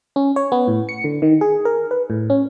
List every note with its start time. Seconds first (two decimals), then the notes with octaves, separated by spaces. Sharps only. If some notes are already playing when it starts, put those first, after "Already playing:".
0.16 C#4
0.36 C#5
0.52 B3
0.68 A2
0.89 C#7
1.04 D3
1.22 D#3
1.41 G#4
1.65 A#4
1.91 B4
2.10 A2
2.30 C#4